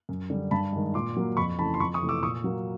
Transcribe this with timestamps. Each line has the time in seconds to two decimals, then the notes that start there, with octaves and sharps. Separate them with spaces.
0.09 F#2
0.30 D3 G3
0.51 G2 A5 B5
0.72 D#3 G#3
0.94 A#2 C6 D6
1.16 F#3 A#3
1.37 F2 B5 C#6
1.59 C#3 E3 A3 A5 B5
1.74 C6
1.80 F2 B5 C#6
1.94 C#6 D#6
2.02 C3 E3 A3
2.09 D6 E6
2.22 A#2 C#6 D#6
2.44 F#3 A#3